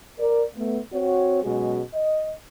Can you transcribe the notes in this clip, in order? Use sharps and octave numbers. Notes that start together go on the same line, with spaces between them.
A#4 D5
A3 B3
C4 F#4 C#5
B2 F#3 G#3 C#4 F#4 G#4
D#5